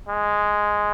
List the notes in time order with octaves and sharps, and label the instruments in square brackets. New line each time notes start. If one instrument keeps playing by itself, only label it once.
[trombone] G#3